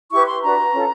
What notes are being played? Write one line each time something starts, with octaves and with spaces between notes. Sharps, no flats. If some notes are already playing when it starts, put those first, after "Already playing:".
E4 G4 B4 C#6
C6
D4 F#4 B4 A#5
C#4 F4 A4